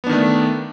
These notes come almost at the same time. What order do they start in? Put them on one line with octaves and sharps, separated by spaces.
B3 D4 D#3 A3